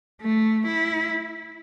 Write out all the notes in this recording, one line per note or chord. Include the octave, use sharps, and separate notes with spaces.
A3
E4